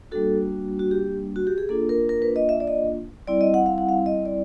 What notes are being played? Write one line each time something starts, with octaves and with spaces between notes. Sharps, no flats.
G3 A#3 D4 F#4 A4
F#4
G4
F#4
G4
G#4
A#3 D4 F4 A4
A#4
A#4
B4
D#5
E5
D5
D#5
G3 C4 E4 D5
D#5
F#5
F5
F#5
F5
D#5
D5